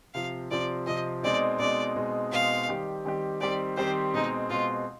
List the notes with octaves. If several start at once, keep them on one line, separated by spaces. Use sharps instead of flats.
C3 F3 C4 F5
C3 F3 C4 D5
C3 F3 C4 D#5
B2 G#3 C4 D#4 D5
B2 G#3 C4 D#4 D5
B2 G#3 C4 D#4
B2 G#3 C4 D#4 F5
D#3 G3 C4 G4
D#3 G3 C4 G4
D#3 G3 C4 G4 D5
D#3 G3 C4 G4 C5
B2 G#3 C4 D#4
B2 G#3 C4 F4